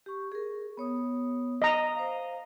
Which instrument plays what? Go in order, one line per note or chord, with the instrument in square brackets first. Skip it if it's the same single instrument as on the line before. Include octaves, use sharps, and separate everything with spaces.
[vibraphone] G4 C#6
G#4 A#4
B3 C#5 D#6
[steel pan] D#5 A#5
[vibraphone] C5 F5